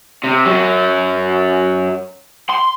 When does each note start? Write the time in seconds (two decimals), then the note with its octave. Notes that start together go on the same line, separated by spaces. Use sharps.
0.24 C3
0.46 F#2 F#3
2.49 C6